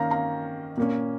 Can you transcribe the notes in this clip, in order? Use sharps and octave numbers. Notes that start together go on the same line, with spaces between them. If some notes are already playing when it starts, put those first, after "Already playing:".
Already playing: D#3 A#3 C#4 F5 A#5
F5 A#5
A#2 A#3 C#4